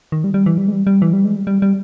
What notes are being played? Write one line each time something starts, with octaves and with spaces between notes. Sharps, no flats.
D#3
G3
G3
E3
G3
G#3
G3
G3
E3
G3
G#3
G3
G3
G3